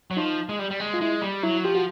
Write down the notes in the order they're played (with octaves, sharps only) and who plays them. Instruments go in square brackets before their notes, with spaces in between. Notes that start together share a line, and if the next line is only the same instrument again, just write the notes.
[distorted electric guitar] F#3
[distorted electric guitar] F3 [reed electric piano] D#4
[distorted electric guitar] G#3
G3
G3
G#3
[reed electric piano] F4
[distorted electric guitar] G#3 [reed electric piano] E4
[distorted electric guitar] G3
[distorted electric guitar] F#3 [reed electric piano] E4
[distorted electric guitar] F3 [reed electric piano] G4
[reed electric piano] F#4